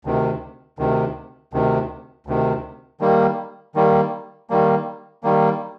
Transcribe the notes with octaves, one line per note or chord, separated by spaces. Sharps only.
D2 C3 D#3
D2 C3 D#3
D2 C3 D#3
D2 C3 D#3
D#3 G3 A#3
D#3 G3 A#3
D#3 G3 A#3
D#3 G3 A#3